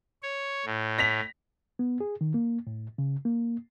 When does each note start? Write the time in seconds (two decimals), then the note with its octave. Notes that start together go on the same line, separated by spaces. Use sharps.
0.22 C#5
0.65 A2
0.98 A#6 B6 F7
1.79 B3
2.00 G#4
2.21 D#3
2.34 A#3
2.67 A2
2.98 C#3
3.25 A#3